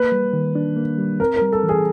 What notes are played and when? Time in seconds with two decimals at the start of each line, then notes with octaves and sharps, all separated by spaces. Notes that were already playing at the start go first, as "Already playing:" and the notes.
Already playing: A#3 B4
0.12 G3
0.33 D#3
0.55 D4
0.76 A#3
0.98 G3
1.20 C4 A#4
1.36 A#4
1.42 G3
1.52 A4
1.63 E3
1.69 G#4